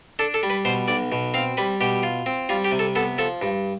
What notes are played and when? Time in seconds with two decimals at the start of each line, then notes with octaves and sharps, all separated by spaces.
0.19 D4 A4
0.34 A4
0.43 G3
0.50 B4
0.65 B2 C5
0.88 B1 D5
1.12 B2
1.34 C4 F5
1.57 G3 B4
1.81 B2 G4
2.03 F4
2.26 C4
2.49 G3 F4
2.65 G4
2.72 C3
2.79 A4
2.96 B3 A4
3.18 F3 A4
3.42 G2